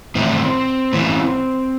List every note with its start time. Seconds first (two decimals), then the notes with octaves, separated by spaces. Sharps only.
0.15 A2 E3 C4
0.93 A2 E3